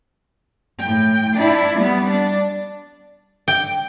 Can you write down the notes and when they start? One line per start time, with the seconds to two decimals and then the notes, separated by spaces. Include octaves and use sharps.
0.80 A2 G5
1.35 D4 E4
1.77 G3 B3
2.10 D4
3.48 G5